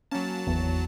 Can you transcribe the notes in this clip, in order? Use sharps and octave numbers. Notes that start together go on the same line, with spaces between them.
F#3 A#3 C#4 A5
G#1 E2